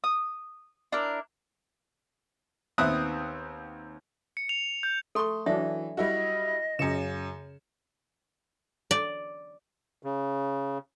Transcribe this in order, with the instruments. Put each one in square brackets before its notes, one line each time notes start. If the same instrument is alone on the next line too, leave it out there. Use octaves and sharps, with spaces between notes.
[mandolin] D#6
D4 E4 A#4
[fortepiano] D#2 B3 C4 E5 D#6 F#6
[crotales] C#7
F7
G6
[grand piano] A3 C6 [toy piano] A4 C#6
[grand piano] E3 [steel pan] F#3 D4 [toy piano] E5
[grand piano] G3 E4 F#4 [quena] D#5
[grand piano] F#2 C#7 E7 [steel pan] C#3
[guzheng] D5
[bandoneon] C#3